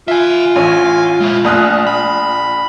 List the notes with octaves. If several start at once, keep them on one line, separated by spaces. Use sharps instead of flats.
F4 E5 G#5
A1 C#5 G#5
G#3 E4
A#1 A3 D#6 F#6
B5